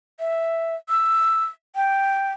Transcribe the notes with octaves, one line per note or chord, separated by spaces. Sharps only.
E5
E6
G5